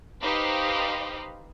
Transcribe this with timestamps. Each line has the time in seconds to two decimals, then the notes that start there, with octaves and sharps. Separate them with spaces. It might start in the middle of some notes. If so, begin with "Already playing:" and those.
0.22 D#4 G4 B4 C5 D#5 F5